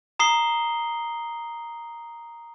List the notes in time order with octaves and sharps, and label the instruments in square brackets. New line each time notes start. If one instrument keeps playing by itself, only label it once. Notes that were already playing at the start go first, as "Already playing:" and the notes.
[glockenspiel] A#5 D#6 C7 G7